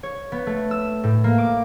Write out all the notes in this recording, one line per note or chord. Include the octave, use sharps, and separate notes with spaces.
C#5
B3
A3
E6
A2
A#3
D6